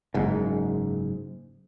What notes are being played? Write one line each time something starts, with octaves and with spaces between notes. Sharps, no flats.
F#1 G#2